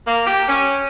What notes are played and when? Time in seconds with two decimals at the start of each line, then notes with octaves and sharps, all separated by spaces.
0.07 A#3
0.27 G4
0.48 C#4